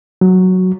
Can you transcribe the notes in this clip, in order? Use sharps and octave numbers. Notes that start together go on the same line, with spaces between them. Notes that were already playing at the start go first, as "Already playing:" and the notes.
F#3